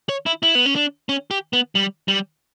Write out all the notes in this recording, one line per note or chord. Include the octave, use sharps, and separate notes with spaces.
C#5
E4
E4
B3
C#4
D4
C#4
G4
B3
G3
G3